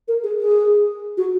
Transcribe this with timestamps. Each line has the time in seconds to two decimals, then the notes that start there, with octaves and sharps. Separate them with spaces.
0.08 A#4
0.23 G#4
0.40 G#4
1.17 F#4